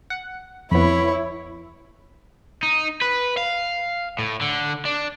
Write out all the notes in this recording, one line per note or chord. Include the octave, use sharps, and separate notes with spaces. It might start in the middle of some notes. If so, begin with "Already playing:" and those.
F#5
F2 B3 E4 C#5 B5
D#4
B4
F5
A2
D3
D4